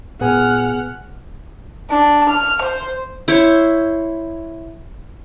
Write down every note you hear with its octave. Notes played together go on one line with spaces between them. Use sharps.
A#2 B3 G#4 F#5 G#5 F6
D4
F6
C5
E4 C5 C#5